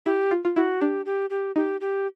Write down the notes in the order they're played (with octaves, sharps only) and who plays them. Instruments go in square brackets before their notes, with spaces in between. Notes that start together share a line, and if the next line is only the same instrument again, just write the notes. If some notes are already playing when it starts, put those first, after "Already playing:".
[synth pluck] E4 [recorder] G4
[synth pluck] F4
F4
[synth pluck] E4 [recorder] F#4
[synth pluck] D4 [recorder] G4
[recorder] G4
G4
[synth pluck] D#4 [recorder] G4
[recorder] G4